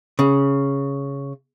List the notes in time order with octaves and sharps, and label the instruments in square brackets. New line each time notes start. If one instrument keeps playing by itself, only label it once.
[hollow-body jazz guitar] C#3